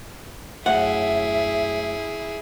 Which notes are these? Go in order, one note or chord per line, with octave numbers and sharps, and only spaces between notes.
F#2 A2 E4 G#4 E5 F#5